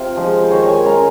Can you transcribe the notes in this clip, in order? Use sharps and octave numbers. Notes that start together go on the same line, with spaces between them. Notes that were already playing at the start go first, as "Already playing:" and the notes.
Already playing: C3 C4 F4
F3 G#3 D#4
C5
D#3 C#5
G#5
G#3 C#4 F4 A#5